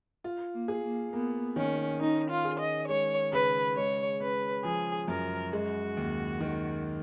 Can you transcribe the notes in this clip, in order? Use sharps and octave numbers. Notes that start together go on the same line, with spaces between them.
F4
A#3
G#4
A#3
A#3 B3
D#3 C#4
C#4 D#4
F4
G#4
D#5
G#3 C#5
C#3 B4
G#3 C#5
C#4 B4
F3 G#4
F#2 A#4
G#3 F#4
D#2
D#3